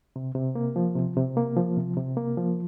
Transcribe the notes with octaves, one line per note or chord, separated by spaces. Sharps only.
C3
C3
A#3
F3
C3
C3
A#3
F3
C3
C3
A#3
F3